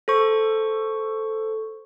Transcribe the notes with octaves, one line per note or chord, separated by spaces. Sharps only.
A4 C5 C#6